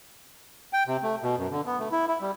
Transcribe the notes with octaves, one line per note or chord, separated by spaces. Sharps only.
G5
C3
A3
B2
F#2
D3
B3
A3
E4
E4
G3